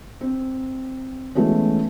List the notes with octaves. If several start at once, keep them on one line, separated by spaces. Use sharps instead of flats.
C4
E3 G#3 A3 B3 C#4